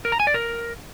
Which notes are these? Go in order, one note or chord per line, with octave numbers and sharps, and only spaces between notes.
A#4
A#5
G#5
D5
A#4